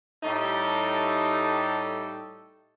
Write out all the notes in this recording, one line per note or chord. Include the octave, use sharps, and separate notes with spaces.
A2 G3 A3 D#4 G4 A4